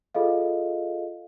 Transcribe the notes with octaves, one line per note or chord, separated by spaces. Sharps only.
F4 G#4 A4 D#5 F5